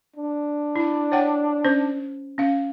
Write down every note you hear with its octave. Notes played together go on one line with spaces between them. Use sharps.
D4
E4 B5
C#5 F#5 G5
C#4 C5
C#4 F5